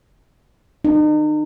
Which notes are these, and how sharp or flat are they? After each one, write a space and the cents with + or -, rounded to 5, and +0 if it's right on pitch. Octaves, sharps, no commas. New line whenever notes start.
D#4 -40